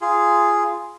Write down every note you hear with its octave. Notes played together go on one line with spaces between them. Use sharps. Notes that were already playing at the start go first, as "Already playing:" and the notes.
F4 G#4